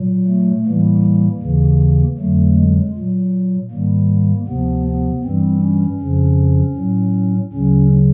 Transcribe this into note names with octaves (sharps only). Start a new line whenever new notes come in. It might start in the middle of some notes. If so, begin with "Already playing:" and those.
Already playing: A#2 F#3
A3
A2 E3 G3 A#3
D#2 C#3 E3
F2 D3 F#3 A3
G#3
A#2 F#3
G#2 D#3 G3 A#3
D2 C3 F3 B3
B3
G2 E3 G3 C4
C#4
F2 C#3 F3
A2 F#3
D2 C#3 F#3 C#4